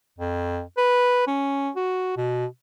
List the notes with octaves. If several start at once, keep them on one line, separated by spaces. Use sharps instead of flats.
F2
B4
C#4
F#4
B2